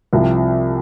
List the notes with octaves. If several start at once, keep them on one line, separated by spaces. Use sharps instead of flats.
C2 C3 F3